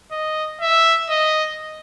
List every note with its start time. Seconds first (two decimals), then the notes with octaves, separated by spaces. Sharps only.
0.12 D#5
0.61 E5
1.10 D#5